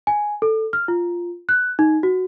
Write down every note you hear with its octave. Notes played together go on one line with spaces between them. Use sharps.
G#5
A4
F6
F4
F#6
D#4
F#4